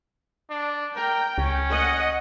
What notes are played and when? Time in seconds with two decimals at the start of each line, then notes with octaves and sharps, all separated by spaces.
0.50 D4
0.96 A#4 G5
1.38 C#2 C#4
1.70 D#5 F#5